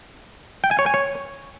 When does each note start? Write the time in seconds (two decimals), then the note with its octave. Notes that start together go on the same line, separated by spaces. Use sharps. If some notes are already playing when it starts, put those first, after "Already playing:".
0.64 G5
0.71 G#5
0.79 C#5
0.86 G#5
0.94 C#5